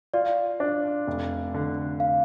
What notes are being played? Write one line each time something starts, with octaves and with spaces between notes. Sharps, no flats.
F4 D5
D4
F1
D3
F5